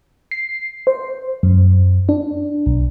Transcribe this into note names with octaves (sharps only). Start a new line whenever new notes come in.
C7
C5
F#2
D4
B1